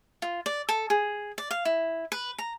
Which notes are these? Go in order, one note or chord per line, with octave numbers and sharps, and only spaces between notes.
F4
D5
A4
G#4
D5
F5
E4
B4
A#5